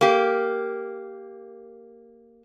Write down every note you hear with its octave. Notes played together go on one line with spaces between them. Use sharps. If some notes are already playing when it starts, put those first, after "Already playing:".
A#3 G4